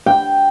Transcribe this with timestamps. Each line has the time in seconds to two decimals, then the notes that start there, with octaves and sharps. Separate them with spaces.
0.06 G5